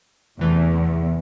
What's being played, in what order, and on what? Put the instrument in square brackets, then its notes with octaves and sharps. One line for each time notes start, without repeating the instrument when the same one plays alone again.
[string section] E2 [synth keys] C3 E3 A3